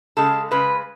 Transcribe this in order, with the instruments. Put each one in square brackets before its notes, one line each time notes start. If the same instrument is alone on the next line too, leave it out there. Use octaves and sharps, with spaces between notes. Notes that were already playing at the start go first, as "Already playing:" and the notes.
[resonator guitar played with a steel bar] C#3 G#3 A4
C#3 G#3 B4